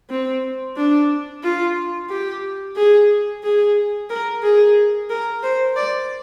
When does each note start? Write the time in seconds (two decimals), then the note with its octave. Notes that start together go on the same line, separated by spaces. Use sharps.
0.10 C4
0.77 D4
1.44 F4
2.10 G4
2.76 G#4
3.43 G#4
4.10 A#4
4.43 G#4
5.10 A#4
5.43 C5
5.76 D5